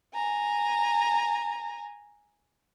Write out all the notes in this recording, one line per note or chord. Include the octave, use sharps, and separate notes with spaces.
G#5 A#5